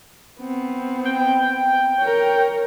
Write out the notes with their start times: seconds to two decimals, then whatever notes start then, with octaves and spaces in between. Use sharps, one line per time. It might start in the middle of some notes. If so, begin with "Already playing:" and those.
0.40 B3 C4
1.05 G5
2.00 A#4 C#5